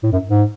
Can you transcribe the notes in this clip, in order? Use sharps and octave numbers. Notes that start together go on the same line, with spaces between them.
A2
F#2
G#2